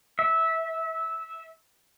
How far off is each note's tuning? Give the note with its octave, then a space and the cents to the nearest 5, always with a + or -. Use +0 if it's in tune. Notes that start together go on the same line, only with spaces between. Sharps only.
E5 -15